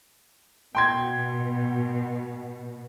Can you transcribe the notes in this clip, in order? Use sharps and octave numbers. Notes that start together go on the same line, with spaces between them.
B2 G5 C6 G#6